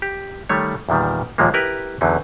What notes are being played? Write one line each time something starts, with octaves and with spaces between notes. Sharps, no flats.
G4
D#3 G3 A3 C#5
E2 A#2 D#3 G3
D#2 A#2 F3 G#3 A#3
E4 G4 A#4 B4
E2 D3 F#3 D#4